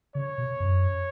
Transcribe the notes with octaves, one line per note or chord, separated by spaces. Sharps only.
C#3 C#5
B2
F#2